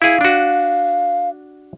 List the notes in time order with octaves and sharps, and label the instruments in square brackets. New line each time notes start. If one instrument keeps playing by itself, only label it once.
[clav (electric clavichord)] E4 G#4 [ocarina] F5
[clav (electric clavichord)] D4 F#4